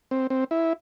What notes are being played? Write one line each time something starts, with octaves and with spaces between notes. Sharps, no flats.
C4
C4
E4